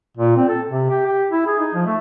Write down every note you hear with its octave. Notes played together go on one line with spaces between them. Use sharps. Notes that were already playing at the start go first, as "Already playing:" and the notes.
A#2
C4
A4
C3
G4
G4
E4
G#4
D#4
F3
A3